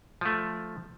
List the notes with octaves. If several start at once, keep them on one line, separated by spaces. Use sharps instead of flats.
F3 A3